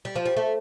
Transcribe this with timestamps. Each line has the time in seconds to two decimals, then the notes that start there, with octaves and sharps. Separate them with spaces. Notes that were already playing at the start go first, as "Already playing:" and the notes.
0.05 G3
0.15 F3
0.26 G3
0.36 A3